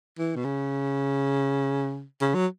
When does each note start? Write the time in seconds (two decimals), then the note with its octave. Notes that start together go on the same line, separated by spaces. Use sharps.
0.19 E3
0.36 B2
0.44 C#3
2.21 C#3
2.34 F#3